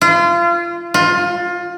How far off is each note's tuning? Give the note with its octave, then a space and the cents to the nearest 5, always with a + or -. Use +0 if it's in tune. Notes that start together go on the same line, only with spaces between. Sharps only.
F4 -30
F4 +20